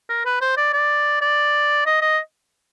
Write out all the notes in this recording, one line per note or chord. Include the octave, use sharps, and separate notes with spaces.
A#4
B4
C5
D5
D5
D5
D#5
D#5